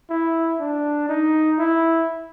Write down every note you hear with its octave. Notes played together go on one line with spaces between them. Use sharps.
E4
D4
D#4
E4